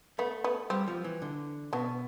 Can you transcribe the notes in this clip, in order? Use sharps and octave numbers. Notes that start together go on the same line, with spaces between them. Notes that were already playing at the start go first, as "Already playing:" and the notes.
A3 B3
B3
G3 C4
F3
E3
D3
B2 B3 D4